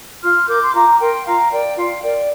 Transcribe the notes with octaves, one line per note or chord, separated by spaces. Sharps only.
F4 C6 F6
A#4 D6 G6
C6
F4 A#5 D6
D6
A#4 G5 C6
F4 F5 A#5
A#4 D5 G5
F4 F5
A#4 D5 G5